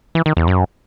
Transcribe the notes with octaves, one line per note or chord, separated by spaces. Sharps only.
E3
D#3
E2
F#2